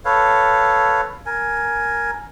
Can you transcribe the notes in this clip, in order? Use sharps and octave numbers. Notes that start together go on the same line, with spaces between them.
A4 B4 C#5 F5
A#4 G#5